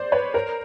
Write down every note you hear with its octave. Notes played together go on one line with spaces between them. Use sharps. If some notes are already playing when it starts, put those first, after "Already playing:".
Already playing: C5 D5
B4 C#5
A#4 C5